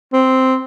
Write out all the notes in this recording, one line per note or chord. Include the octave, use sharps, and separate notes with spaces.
C4